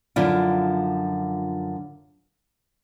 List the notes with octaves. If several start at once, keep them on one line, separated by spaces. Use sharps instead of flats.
F#2 D3 F3 E4 F4